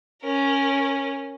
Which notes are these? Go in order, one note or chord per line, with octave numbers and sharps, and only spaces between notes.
C#4 A#4